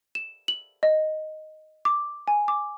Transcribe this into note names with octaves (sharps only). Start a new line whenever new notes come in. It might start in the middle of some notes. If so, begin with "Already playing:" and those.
E7
F#7
D#5
D6
G#5
D6